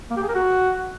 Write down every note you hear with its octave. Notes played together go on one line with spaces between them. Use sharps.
A#3
G4
G#4
A#4
F#4